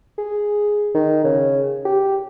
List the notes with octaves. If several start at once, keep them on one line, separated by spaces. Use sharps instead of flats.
G#4
D#3
C#3
G4